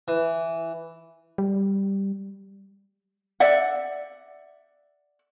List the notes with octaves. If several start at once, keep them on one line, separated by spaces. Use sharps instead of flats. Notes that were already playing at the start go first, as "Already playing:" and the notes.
E3
G3
D5 E5 F#5